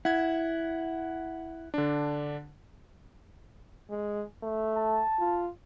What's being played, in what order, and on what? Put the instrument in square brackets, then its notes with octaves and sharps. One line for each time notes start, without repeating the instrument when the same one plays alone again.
[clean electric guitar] E4 [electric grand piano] F#5 G#6
[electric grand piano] D3 D4
[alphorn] G#3
A3
[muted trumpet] A5
[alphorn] F4